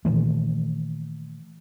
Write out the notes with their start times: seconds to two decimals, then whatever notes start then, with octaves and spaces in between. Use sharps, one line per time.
0.05 A#2 D#3 E3 A3